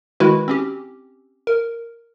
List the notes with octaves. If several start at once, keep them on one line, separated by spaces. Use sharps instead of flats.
D#3 G#3 E4 F#4 B4
C4 C#4 G4
A#4